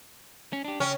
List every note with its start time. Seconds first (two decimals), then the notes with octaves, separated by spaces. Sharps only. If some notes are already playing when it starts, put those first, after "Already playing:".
0.53 C#4
0.65 D4 G4
0.80 C#3 C#4 G5